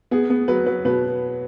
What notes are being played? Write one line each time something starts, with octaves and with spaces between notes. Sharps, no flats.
B3 G#4
B3
F#3 B4
F#3 B4
B2 B4